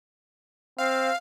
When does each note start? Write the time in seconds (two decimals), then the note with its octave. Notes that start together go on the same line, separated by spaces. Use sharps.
0.79 C4 F5